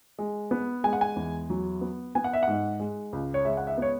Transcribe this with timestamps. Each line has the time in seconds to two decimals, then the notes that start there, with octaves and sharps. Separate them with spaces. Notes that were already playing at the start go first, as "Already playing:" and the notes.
0.19 G#3
0.51 B3
0.84 G#3 G#5
0.93 F#5
1.01 G#5
1.16 E2
1.50 F#3
1.81 B3
2.15 B3 G#5
2.24 F#5
2.33 E5
2.43 G#2 F#5
2.80 G#3
3.13 C#2
3.34 C#5
3.45 G#3 E5
3.57 F#5
3.67 E5
3.78 B3 C#5